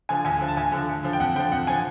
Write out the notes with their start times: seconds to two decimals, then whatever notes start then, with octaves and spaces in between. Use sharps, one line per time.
0.09 D3 F3 G#5
0.25 D2 G#5
0.41 D3 F3
0.48 A5
0.57 D2 G#5
0.72 D3 F3
0.89 D2
1.04 D3 F3
1.13 G5
1.20 F2 F#5
1.36 D3 F3 G5
1.52 F2 F#5
1.67 D3 F3 G#5